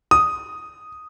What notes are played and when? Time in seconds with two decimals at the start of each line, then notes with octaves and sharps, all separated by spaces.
0.11 D#6